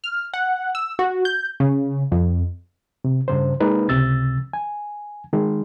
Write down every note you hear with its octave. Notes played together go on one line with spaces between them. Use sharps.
F6
F#5
E6
F#4
G6
C#3
F2
C3
G2 C#3 C5
G#3 A#3 D#4 B4
C#2 C3 E6 A6
G#5
D#3 G#3